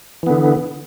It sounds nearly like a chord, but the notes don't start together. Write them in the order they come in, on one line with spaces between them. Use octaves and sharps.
E3 B3 D3